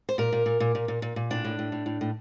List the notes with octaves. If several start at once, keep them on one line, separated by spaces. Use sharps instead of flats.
C5
A#2 A#4
A#2
A#2
A#2
A#2
A#2
A#2
A#2
A2 D4
A2
A2
A2
A2
A2